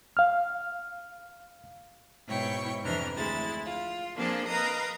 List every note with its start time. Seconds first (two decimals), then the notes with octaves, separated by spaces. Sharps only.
0.17 F5 F6
2.27 G#2 B2 E4 C#5 G5 C#6
2.83 F2 C3 E3 D4 A#5 F6
3.16 D2 G#3 E4 A6
3.65 F4
4.15 F3 A#3 C4 D4 G#4 A4
4.47 A#4 B4 D#5 F5 A#5 D#6